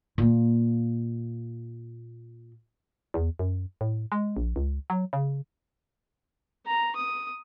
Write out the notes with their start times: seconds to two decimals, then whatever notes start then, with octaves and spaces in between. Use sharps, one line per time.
0.18 A#2 A#3
3.14 E2
3.39 F#2
3.81 A2
4.12 G#3
4.37 A#1
4.56 C#2
4.90 F#3
5.13 C#3
6.66 A#5
6.96 D#6